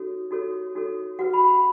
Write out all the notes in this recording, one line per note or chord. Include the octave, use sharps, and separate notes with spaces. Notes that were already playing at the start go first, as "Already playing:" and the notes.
Already playing: D#4 F#4 A4 C#5
D#4 F#4 A4 C#5
D#4 F#4 A4 C#5
F#4 B4 F#5
B5
B5